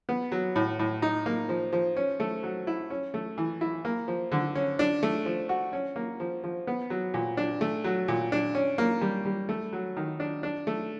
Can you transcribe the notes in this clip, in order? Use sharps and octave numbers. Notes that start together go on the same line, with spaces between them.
B3
F#3
A2
A2
D#4
A#3
F3
F3
C#4
A3
F#3
E4
C#4
A3
E3
E4
A#3
F3
D3
C#4
D4
A3
F3
F#4
C#4
A#3
F3
F3
B3
F#3
A#2
D4
A3
F#3
A#2
D4
C#4
A#3
G3
G3
A3
F#3
D#3
D4
D4
A3